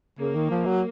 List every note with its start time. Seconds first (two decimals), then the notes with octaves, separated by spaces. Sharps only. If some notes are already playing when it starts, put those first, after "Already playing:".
0.19 C#3 A#3
0.35 D#3
0.51 F3
0.66 F#3